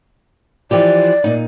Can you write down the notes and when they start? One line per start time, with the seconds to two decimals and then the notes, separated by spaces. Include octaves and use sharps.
0.71 E3 F3 G4 D5
1.24 A#2 D#4